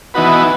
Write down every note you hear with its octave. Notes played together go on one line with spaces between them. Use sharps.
E3 B3 D#4 F#4 B4